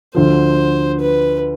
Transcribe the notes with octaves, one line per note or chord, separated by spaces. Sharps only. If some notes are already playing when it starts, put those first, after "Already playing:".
D2 D3 F3 C5
B4